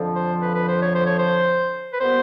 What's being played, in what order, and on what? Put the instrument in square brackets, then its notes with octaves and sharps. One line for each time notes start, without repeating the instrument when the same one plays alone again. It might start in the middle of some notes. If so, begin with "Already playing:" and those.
Already playing: [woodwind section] F2 D3 F3
[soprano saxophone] C5
B4
B4
C5
C#5
C5
C#5
C5
B4
[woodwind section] A#2 G3 B3 [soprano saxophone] C5